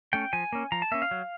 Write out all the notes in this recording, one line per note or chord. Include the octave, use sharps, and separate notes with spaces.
A3 C#4 G5
F3 G#5
A#3 C#4
F3 A#5
A5
A#3 C#4 E5
F5
F#3